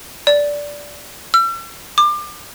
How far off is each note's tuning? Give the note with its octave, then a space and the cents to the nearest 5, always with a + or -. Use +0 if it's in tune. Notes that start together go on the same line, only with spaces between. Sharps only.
D5 -10
E6 +40
D6 +30